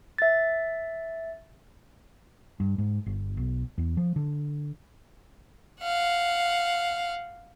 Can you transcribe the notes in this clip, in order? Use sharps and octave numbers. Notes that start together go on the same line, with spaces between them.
E5 A6
G2
G#2
G1
B1
E2
F3
D3
F5 F#5